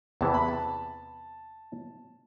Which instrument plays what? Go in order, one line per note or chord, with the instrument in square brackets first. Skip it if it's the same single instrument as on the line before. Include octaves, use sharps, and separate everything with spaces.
[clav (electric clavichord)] E2 C3 E3 B3 [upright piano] A5
[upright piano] B5
A5